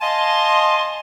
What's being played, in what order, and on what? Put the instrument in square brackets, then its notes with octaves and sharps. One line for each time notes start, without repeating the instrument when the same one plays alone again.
[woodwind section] D#5 F5 G#5 A5 C6